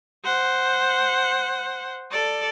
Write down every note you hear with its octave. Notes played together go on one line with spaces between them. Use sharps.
C5 F#5
A4 D5